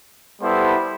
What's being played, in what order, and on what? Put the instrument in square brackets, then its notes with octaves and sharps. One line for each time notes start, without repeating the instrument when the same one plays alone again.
[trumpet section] G3 B3 E4 A4 C5